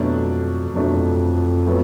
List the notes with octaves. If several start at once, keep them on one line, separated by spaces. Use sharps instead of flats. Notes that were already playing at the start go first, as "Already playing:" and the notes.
Already playing: F2 B2 F#3 A3 D4
F2 B2 F#3 A3 D4
A2 F#3 B3 E4